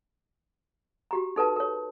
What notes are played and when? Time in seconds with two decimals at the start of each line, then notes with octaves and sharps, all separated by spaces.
1.11 F#4 G4 A#5
1.36 D#4 A4 B4 A5
1.56 A#4 C#5